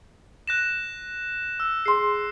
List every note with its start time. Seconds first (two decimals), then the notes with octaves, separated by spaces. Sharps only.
0.48 F#6 A#6 E7
1.60 E6
1.86 G#4 C6 C7